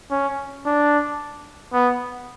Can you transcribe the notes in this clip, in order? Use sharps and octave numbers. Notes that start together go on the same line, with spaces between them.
C#4
D4
B3